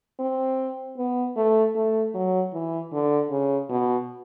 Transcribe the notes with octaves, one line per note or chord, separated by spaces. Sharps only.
C4
B3
A3
A3
F#3
E3
D3
C#3
B2